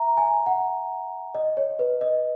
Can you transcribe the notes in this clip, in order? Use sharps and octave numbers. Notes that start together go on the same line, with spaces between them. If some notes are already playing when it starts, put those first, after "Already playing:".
Already playing: E5 A#5
G#5
F#5
D#5
C#5
B4
D#5